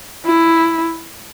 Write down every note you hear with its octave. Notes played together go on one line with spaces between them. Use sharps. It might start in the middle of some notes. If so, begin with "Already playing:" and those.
E4